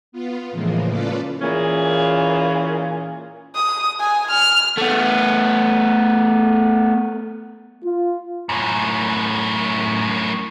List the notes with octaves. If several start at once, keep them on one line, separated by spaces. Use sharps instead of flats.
B3 F4
A2 C#3 E3 F3 G#3 A#3
C#4 F4 A4 B4 D5
A#2 E3 A#3 C#4 F4 G#4
D#6
G#5
F6
A3 B3
F4
F#2 A2